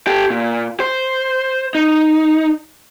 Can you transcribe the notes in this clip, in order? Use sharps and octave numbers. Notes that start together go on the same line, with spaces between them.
G4 A4
A#2
C5
D#4